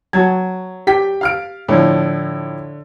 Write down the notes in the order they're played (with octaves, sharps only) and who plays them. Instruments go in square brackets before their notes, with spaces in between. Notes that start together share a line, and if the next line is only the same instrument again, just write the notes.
[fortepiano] F#3 [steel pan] F#4 A5 [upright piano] G#6
[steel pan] G4 [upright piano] G5 B6
[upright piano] F5 F6 D7
[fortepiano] A2 F3 [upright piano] D3